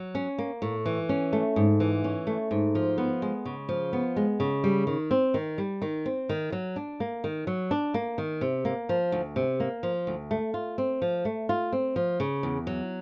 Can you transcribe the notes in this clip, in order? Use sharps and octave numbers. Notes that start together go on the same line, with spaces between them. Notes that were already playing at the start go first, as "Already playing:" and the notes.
Already playing: F#3
C#4
A#3
A2
E3
C#4
A3
G#2
E3
C#4
A3
G#2
F3
B3
G#3
C#3
F3
B3
G#3
C#3
G3
D#3
C4
D#3
G3
D#3
C4
D#3
F#3
D4
A#3
D#3
F#3
D4
A#3
D#3
C3
A#3
F3
D2
C3
A#3
F3
D2
A3
F4
C4
F3
A3
F4
C4
F3
C#3
E2
F#3